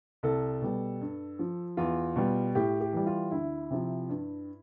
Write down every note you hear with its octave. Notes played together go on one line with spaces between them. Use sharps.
C2 A4
B2 G3
G2
F3
E2 F4
B2 G3
A2 G4
G4
E3 G3
F4
D2 E4
C3 F3
G2